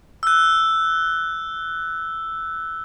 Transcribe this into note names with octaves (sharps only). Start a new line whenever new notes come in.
E6 F#6